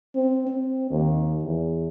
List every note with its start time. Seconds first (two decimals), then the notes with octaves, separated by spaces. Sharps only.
0.15 C4
0.47 C4
0.90 D#2
1.43 E2